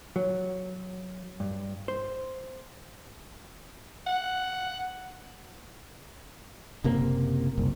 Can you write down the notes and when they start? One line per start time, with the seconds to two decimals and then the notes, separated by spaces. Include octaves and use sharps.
0.16 F#3
1.40 G2
1.88 C5
4.07 F#5
6.84 F#1 C3 A#3
7.58 F#1 C2